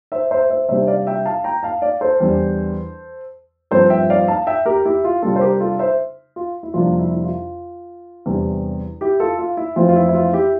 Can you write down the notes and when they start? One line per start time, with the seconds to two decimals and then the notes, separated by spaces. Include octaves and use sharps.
0.12 C5 E5
0.31 C5 E5
0.50 C5 E5
0.69 C3 G3 D4 C5 E5
0.87 D5 F5
1.07 E5 G5
1.25 F5 A5
1.44 G5 A#5
1.63 F5 A5
1.82 D5 F5
2.01 A4 C5
2.20 E2 E3 G3 D4
3.71 G2 F3 C4 A4 C5
3.90 E5 G5
4.10 D5 F5
4.28 F5 A5
4.47 E5 G5
4.66 G4 A#4
4.86 E4 G4
5.04 F4
5.22 C3 G3 D4 F4 A4
5.36 C5
5.41 G4 A#4
5.60 F4 A4
5.79 C5 E5
6.36 F4
6.63 E4
6.74 F2 C3 G3 A#3 D4 F4
6.99 E4
7.12 E4
7.24 F4
8.26 E2 C3 G3 D4
9.01 E4 G4
9.20 F4 A4
9.39 F4
9.57 E4
9.76 F2 E3 A3 C4 F4
9.88 F4
9.96 E4
10.09 E4
10.15 F4
10.33 E4 G4